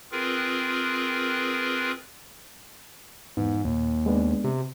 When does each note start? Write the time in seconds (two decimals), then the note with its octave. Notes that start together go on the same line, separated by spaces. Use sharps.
0.12 C4 F4 G#4 A#4 B4
3.37 E2 G#2 B3
3.65 D#2 A#2
4.06 G#3 B3 D4
4.44 C3